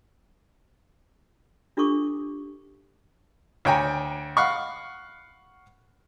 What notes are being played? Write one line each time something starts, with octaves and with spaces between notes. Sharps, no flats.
D4 F4 G4 A4 C#6 D6
D2 C#5 G5 G#5 A#5
F5 F#5 B5 C#6